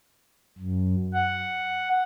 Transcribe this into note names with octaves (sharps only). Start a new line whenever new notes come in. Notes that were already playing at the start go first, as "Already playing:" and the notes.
F#2
F#5